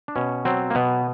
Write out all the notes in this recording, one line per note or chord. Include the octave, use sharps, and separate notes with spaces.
D4
B2 C#4
F#3 C4
A#3
B2 B3